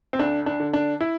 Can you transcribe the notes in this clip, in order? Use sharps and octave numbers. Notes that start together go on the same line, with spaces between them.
C4
D2 D4
D4
D3
D4
E4